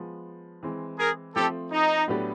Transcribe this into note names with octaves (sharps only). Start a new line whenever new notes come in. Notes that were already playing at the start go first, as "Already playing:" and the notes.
Already playing: F3 G#3 B3
E3 G#3 C4
G#4 A#4
F3 A3 C4 G4 A4
D#4
A2 F#3 B3 D4 G4